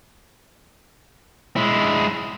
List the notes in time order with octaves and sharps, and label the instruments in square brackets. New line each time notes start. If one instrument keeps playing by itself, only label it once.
[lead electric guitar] G#3 E4